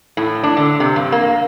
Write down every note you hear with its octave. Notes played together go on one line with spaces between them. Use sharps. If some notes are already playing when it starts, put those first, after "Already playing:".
A2
D4
D3
C3
G2
A#3